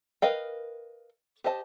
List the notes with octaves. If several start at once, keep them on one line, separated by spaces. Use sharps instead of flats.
A#4 B4 D#5 F5 G5
G4 C5 D#5 A5